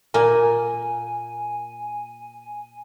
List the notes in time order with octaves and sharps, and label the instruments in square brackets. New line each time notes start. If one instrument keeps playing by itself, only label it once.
[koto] A#2 A#3 [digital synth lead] G#5